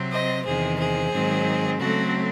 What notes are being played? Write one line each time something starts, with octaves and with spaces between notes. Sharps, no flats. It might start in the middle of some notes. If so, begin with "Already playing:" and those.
Already playing: C3 F#3 C4
C5 D#5
E2 C3 D#3 G#4 C5
G#4 C5
G#2 D#3 F#3 C4
C#3 F#3 A3 C4 F#4 A4